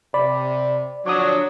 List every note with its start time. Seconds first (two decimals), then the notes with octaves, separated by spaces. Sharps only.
0.14 C3 D5 B5
1.06 D3 F3 F#3 D4 D6 D#6